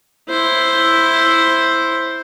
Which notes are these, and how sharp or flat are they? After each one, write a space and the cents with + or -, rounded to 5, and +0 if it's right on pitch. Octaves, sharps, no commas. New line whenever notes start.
E4 +0 C5 +0